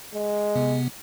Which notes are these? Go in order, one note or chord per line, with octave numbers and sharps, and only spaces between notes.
G#3
C3 B3